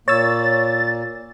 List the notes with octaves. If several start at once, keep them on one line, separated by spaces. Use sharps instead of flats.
A#2 A#3 C#5 E6 A6